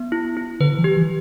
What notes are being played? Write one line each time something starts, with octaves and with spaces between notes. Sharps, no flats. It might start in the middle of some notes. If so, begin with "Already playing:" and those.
Already playing: B3
E4
E4
D3 B4
E3
G4
E3